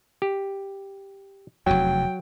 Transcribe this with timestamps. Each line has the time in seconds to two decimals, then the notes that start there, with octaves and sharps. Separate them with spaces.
0.22 G4
1.67 F1 E2 F#3 G5